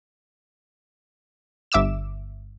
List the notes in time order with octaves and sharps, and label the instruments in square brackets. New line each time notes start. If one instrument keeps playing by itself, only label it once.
[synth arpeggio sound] G1 E5 D6 E6 E7